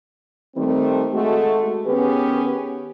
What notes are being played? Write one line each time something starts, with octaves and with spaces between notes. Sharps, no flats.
D#3 G3 A3 C4
G#3 A3 F#4
D#3 B3 C#4 G4 G#4 B4